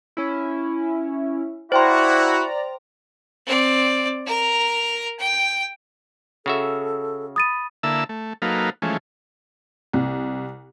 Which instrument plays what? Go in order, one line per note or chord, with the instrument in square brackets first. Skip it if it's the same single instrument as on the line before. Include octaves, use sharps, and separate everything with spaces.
[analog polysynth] C#4 E4
[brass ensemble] E4 F#4 [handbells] C5 G5 C6 [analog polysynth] D5 A#5
[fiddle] C4 D5
A#4 A#5
G5
[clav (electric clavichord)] C#3 F#4 E5 [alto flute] A4
[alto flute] B5 [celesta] D#6 A6 D#7
[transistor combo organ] D3 A#3 E4 E5 A5 E6
A3
F#3 A#3 D#4 A4 B4 F5
E3 F3 G#3 A3 C#4
[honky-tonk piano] C2